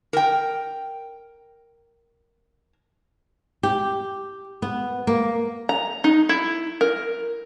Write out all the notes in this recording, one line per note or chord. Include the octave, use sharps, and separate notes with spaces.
A#4 G5
G4
B3
A#3
A#5
D#4
E4
A#4